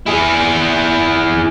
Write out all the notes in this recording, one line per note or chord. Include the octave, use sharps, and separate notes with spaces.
E4 G#4